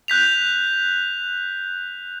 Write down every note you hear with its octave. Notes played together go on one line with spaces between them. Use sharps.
F#6 G6 B6 F7